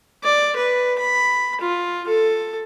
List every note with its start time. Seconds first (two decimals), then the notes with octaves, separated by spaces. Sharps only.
0.24 D5
0.56 B4
0.99 B5
1.61 F4
2.08 A4